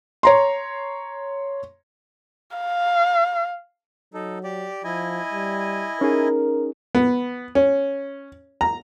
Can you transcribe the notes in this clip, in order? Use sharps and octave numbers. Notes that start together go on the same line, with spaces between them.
C#5 A#5 C6
F5
F#3 D#4 A4
G4 D5
F3 E4 D#5 G#5
G3
C#4 D#4 G#4 A#4
B3
C#4
A#5